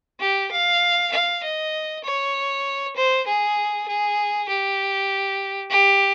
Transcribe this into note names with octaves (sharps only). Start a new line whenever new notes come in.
G4
F5
F5
D#5
C#5
C5
G#4
G#4
G4
G4